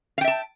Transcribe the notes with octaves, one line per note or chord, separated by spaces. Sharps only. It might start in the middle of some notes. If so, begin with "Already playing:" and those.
E5 F5 G5 A5